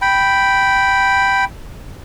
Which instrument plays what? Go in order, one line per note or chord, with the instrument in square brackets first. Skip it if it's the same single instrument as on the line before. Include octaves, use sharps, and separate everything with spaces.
[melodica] G5 B5